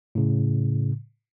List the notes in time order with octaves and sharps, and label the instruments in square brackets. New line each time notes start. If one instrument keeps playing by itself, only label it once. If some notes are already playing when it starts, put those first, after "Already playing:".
[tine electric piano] A2 C#3